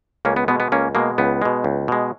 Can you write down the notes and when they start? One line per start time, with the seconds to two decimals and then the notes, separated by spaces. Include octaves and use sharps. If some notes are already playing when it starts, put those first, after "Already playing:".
0.25 C#2 A#3 C#4
0.36 B3
0.48 B2 G#3 B3
0.60 B3
0.72 C#2 A#3 C#4
0.95 B2 G#3 A#3
1.18 C#2 B3
1.42 B2 G#3
1.64 C#2
1.88 B2 G#3